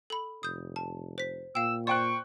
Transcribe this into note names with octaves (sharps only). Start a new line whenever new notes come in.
A4 B5
F1 D#6 G6
A5
C5 B6
A#2 F5 G5 E6
C5 D5 G5 C#6 F#6